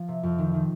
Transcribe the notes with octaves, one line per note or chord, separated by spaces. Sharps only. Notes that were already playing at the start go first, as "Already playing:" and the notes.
Already playing: F3
C3
F2
D#3
D#3